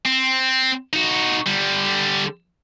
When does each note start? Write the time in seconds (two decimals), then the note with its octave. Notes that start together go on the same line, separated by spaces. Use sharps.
0.05 C4
0.93 D#4 F#4
1.47 D3 G3